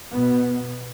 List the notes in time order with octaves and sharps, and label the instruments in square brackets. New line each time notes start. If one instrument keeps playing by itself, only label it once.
[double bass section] B2 B3